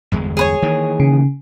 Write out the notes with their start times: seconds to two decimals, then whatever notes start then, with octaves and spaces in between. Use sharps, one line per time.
0.12 G1 E2 G#3
0.37 G#4 B4 C#5
0.62 D#3 E3 A#3
1.00 C#3